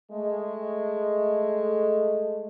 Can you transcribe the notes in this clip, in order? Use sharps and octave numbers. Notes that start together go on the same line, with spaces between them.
G#3 A3